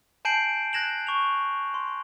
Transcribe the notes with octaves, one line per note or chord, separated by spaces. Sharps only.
G#5 A5 G6 C7 D7 F#7
F#6 G#6 A#6 E7 F#7
C#6 F7
C6